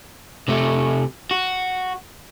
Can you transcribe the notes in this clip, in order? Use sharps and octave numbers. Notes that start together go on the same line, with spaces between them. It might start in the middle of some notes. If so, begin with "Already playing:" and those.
C3 A3
F#4